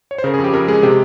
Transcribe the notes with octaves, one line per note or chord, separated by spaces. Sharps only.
C#5
C5
C#3 A#4
G#4
F2
G4
F2 A#4
G#3 G#4
C3 G4